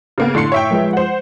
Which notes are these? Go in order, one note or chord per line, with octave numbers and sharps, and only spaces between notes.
C#3 A#3 B3
A2 D3 C6 C7 C#7
C#5 E5 G5
F3 G#3 B4
C5 F#5